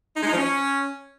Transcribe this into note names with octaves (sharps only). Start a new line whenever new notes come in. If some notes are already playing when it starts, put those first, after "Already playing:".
D#4
G#3
D#4
F3
C#4